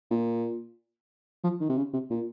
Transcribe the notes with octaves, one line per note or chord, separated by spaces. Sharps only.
A#2
F3
D#3
C3
C#3
C3
A#2